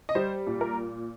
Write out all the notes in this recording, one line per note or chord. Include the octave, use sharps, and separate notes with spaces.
D#5
G3 C5
A#2
A#4